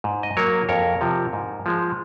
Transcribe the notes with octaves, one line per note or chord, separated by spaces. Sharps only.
G#2
D#5
F#3 A#3 A#4 C#5
F2 A#4 C#5
C3 F3
G#2
F3 G#3